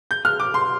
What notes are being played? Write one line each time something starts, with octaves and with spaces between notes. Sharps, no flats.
G6
F6
D6
C6